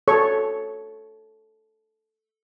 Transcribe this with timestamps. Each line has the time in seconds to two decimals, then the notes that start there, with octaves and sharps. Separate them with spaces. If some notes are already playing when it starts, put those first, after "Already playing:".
0.08 A4 C#5 C#6